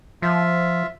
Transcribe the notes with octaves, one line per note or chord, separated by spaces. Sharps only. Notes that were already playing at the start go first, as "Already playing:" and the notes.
F3 F4 E5